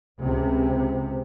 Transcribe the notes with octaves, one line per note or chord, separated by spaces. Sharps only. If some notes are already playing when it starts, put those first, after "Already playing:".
C#2 C3